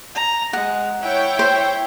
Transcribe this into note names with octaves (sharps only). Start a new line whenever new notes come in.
A#5
G#3 F#5
E4 C#5 G5
C5